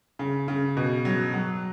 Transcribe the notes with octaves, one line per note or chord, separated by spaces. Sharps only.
C#3
C#3
B2
F#3
F#3